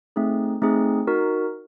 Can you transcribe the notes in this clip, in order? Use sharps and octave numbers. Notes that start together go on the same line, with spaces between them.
A3 C4 D#4 G#4
A3 C4 D#4 G#4
D#4 F#4 A#4